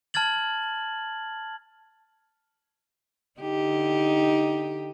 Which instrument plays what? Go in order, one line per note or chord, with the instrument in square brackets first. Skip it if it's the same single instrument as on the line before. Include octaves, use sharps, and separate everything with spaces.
[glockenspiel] A5 F6 G#6 A6 F#7
[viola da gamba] D3 D#4 G4